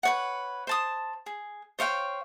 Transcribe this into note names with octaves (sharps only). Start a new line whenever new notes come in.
B4 C#5 F#5
C5 A5 D#6
G#4
C5 C#5 F5 G5